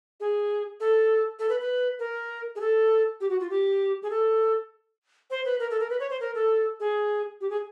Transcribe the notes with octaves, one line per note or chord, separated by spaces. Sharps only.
G#4
A4
A4
B4
B4
A#4
G#4
A4
G4
F#4
F4
G4
G#4
A4
C5
B4
A#4
A4
A#4
B4
C#5
C5
A#4
A4
G#4
G4
G#4